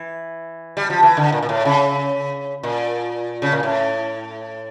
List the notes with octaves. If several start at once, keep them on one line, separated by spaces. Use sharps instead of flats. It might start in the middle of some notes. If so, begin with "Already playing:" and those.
Already playing: E3
G3
F3
E3
D3
A#2
A#2
A2
C#3
A#2
C#3
A#2
A2